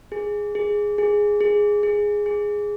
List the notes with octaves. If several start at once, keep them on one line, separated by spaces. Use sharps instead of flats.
G#4
G#4
G#4
G#4
G#4
G#4